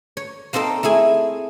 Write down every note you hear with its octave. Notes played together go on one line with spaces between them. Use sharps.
C#5
A#3 C4 D#4 A4 C5
A3 E4 G#4 G#5